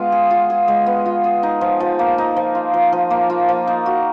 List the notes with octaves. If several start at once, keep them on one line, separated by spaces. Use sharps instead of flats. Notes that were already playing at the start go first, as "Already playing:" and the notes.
Already playing: G#3 B3 F4
G#4
F4
G#4
G#3
B3
F4
G#4
D#4
F3
F3
A#3
D#4
F3
F4
F3
F3
A#3
F4
F3
D#4
F#4